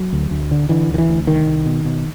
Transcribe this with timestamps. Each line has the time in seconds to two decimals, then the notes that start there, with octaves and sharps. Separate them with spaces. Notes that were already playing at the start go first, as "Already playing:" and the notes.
Already playing: F#3
0.13 D2
0.31 D2
0.51 D3
0.69 D3 E3
0.88 D2
0.94 D#3
0.98 E3
1.09 D2
1.27 C2 D#3
1.46 C2
1.66 B2
1.85 B2